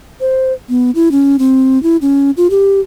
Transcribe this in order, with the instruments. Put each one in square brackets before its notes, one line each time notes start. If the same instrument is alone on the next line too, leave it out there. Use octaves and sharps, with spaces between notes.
[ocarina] C5
B3
E4
C#4
C4
E4
C#4
F4
G4